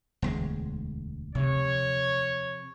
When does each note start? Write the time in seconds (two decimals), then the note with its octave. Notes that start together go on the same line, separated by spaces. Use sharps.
0.22 E1 D2 G#3
1.35 C3 F3 C#5